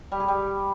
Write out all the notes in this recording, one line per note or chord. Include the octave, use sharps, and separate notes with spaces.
G3
G#4
G3